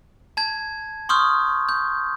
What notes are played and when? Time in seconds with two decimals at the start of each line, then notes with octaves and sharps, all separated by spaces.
0.37 A5 G#6
1.09 C6 C#6 D#6 F6 G6
1.69 G6